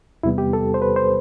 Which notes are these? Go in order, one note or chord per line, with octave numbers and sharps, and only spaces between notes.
E2 C3 G3 B3 E4
G4
A4
C5
B4
C5